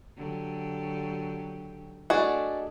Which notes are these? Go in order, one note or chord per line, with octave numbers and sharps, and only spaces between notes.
D3 F#3 G4
A3 D4 F#4 G#4 D5 D#5